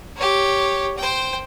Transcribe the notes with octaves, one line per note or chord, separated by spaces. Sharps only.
G4 C#5
C5 G5